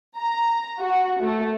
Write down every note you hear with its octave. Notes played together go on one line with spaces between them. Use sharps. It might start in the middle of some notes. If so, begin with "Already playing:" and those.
A#5
F#4
A3